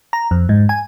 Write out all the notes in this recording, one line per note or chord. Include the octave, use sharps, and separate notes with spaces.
A#5
F2
G#2
G#5